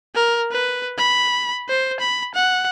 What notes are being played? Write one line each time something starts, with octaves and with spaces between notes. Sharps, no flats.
A#4
B4
B5
C5
B5
F#5